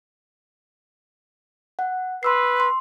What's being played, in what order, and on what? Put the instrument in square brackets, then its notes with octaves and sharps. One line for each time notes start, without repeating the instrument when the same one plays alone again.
[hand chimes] F#5
[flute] B4 [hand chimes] C6 E6 C7
[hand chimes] C6